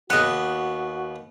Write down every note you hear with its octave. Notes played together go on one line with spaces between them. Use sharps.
D#2 B3 F#4 D#5 F#5